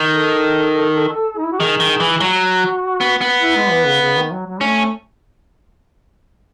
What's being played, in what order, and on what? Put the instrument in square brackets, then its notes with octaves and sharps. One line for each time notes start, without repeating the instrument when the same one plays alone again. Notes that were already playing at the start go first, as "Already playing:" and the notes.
Already playing: [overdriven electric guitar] D#3
[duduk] A4
D#4
E4
F#4
[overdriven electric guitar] D#3 [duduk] G#4
[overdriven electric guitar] D#3
E3
[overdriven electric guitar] F#3 [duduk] F#4
[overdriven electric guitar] B3
B3
[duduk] E4
G#3
E3
C#3
C#3
D#3
F#3
F#3
[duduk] A3 [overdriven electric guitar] C#4